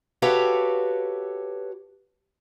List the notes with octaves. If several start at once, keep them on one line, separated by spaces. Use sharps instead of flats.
F#4 G4 A4 B4 C#5 F5